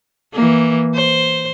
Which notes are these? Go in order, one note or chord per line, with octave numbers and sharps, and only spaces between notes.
E3 A#3
C5